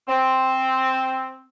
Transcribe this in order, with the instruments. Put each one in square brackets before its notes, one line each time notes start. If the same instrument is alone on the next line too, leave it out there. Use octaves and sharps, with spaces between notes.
[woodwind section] C4